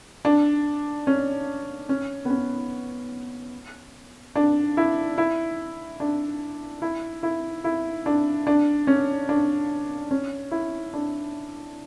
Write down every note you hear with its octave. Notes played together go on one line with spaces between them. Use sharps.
D4
C#4
C#4
B3
C#4
D4
E4
E4
D4
E4
E4
E4
D4
D4
C#4
D4
C#4
E4
D4